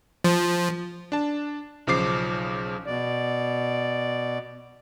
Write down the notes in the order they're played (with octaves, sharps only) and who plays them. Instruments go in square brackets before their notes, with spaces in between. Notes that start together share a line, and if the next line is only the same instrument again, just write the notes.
[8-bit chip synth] F3
[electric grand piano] D4 A5
B1 C#3 F3 D6 C7
[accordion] B2 D5